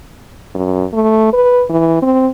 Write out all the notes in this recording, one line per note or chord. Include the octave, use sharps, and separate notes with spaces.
F#2
A3
B4
E3
C4